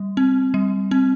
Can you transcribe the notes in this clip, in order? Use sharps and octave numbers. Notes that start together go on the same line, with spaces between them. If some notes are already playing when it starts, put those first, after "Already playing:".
Already playing: G3
C4
G3
C4